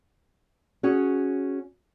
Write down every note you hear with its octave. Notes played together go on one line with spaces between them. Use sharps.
C#4 F#4 G#4 C#5